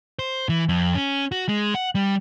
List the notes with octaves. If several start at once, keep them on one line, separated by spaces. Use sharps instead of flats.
C5
E3
F2
C#4
F#4
G#3
F#5
G3